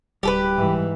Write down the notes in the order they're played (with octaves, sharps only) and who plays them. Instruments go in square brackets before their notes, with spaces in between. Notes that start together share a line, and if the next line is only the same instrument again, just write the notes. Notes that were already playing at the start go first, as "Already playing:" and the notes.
[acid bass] D1 [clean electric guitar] G3 [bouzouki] G4 G#4 B4
[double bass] G#2 E3